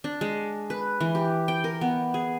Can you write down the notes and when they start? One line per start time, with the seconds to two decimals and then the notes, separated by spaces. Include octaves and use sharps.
0.04 D4
0.21 G#3
0.70 B4
1.01 E3
1.15 G4
1.48 G5
1.64 A#4
1.81 B3
2.14 G#4